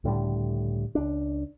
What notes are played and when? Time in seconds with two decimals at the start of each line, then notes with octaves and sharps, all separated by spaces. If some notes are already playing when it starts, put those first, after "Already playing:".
0.04 C#2 A2 D3 G3
0.95 C#2 D4